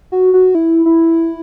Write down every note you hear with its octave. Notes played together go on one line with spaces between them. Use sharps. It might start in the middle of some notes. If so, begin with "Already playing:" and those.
F#4
F#4
E4
E4